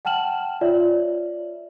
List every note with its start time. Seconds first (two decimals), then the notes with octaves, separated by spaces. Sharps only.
0.05 F#5 G5 A5 F6 E7 F#7
0.61 F4 C#5 D5 E5